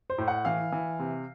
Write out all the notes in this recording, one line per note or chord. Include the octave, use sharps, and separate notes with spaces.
C5
A2
F#5
E3 F5
E3
C3